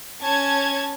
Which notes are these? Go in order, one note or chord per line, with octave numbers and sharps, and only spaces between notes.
C#4 A5 G#6